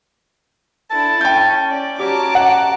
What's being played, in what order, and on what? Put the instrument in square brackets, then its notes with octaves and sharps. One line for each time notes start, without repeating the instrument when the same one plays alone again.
[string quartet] D4 E4 A4 [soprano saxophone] A5
[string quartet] C#4 [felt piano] G5 G6
[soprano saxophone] C#4 [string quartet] D5
[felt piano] C#4 G4 [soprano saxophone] F#4 [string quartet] A5 A#5 D6
[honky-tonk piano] F#5